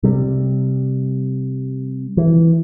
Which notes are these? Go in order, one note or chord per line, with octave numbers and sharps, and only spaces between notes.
C3 G3
E3